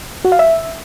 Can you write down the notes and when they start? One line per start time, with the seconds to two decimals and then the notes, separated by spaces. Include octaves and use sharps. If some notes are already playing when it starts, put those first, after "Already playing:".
0.25 F#4
0.32 F5
0.39 E5